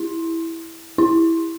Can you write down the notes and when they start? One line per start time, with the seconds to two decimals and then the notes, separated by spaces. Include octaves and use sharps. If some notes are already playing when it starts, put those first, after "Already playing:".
Already playing: E4
0.98 E4